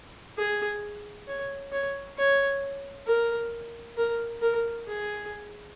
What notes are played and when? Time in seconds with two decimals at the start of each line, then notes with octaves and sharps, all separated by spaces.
0.37 G#4
1.27 C#5
1.72 C#5
2.17 C#5
3.07 A#4
3.97 A#4
4.42 A#4
4.87 G#4